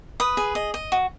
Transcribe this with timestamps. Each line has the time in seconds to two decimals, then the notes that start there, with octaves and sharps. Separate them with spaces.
0.20 B4 D#6
0.37 G#4
0.55 D#5
0.74 D#5
0.92 F#4